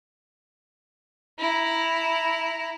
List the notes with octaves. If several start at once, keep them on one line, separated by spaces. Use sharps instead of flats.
E4 A#5